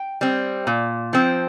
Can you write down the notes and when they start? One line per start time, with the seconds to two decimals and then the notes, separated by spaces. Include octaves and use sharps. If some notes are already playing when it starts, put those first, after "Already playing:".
Already playing: G5
0.21 G3 C4
0.67 A#2
1.13 F3 C4